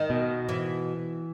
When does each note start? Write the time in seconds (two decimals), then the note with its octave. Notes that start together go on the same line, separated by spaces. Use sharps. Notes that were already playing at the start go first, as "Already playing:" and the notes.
Already playing: D#3
0.10 B2
0.49 E3